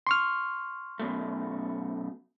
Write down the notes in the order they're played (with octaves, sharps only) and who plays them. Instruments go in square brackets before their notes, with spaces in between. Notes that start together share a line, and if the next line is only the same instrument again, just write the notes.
[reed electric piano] C6 C#6 F6
[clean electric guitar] F#2 B2 A3